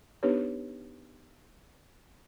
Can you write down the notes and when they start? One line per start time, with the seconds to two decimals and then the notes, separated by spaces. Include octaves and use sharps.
0.23 B3 D4 D#4 G4 B4 C#5